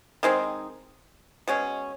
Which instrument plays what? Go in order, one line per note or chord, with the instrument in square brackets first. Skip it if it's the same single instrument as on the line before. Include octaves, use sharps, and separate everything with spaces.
[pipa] D#3 G#3 C4 D#4
B2 G#3 C#4